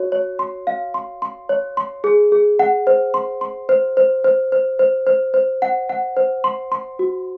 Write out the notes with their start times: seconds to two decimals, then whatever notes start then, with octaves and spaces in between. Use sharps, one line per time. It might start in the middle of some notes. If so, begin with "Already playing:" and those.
Already playing: F#4 C#5
0.12 C#5
0.39 C6
0.67 F5
0.94 C6
1.22 C6
1.49 C#5
1.77 C6
2.04 G#4
2.32 G#4
2.59 F#5
2.87 C5
3.14 C6
3.41 C6
3.69 C5
3.97 C5
4.24 C5
4.52 C5
4.79 C5
5.07 C5
5.34 C5
5.62 F#5
5.89 F#5
6.17 C5
6.44 C6
6.72 C6
6.99 F#4